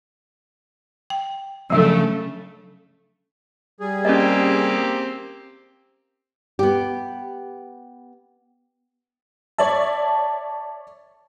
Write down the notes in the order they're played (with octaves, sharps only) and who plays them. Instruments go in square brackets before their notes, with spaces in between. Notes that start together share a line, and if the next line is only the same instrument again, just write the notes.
[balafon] G5
[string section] C#3 A3 [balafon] F3 F#3 D4
[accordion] G3 G#4
[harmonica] A#3 C4 G4 [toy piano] C#4 D#5
[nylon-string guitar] B3 G4
[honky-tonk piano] C#5 D5 E5 [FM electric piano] A5